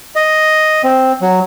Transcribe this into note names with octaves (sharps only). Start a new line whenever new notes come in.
D#5
C4
F#3